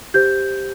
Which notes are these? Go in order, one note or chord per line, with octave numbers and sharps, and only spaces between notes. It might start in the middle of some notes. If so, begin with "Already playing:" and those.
G4 C5 G6